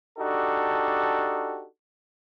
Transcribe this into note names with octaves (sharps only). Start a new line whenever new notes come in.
D4 D#4 F#4 G4 A4